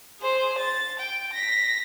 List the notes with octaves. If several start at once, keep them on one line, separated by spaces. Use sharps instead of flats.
G#4 C5
A6
G5
A#6 B6